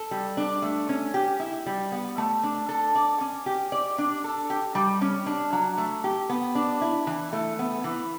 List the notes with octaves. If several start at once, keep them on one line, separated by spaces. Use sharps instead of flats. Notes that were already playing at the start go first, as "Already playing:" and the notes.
Already playing: A4
G3
D4
A3
C#4
G4
E4
G3
B3
A3
D4
A4
D5
C#4
G4
D5
D4
A4
G4
G3
C#4
D4
F#3
A3
G4
B3
D4
E4
E3
A3
B3
E3